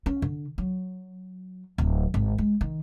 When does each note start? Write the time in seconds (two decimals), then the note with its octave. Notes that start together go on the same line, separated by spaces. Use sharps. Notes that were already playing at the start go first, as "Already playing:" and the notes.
0.06 C#4
0.22 D3
0.58 F#3
1.78 D1
2.14 G#1
2.38 G#3
2.61 D#3